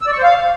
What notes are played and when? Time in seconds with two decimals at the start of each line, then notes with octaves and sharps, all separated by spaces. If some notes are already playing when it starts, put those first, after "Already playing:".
0.02 E6
0.07 D5
0.13 C#6
0.18 C5
0.23 F5